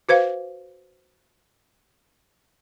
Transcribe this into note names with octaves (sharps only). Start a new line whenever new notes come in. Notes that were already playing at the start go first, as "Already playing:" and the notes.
F#4 B4 C5 F5